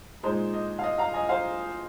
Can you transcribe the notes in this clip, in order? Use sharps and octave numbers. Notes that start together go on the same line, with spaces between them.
A#2 G#3 D#4 C5
D#5
F5
D#5
F5 A#5
D#5 G#5
C5 F5